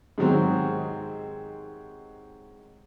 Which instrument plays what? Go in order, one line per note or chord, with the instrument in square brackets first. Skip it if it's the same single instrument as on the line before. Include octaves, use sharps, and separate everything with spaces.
[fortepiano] G#2 C3 D#3 F#3 G#3 C4